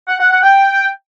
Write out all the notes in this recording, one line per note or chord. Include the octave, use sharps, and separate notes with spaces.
F#5
F#5
F#5
G5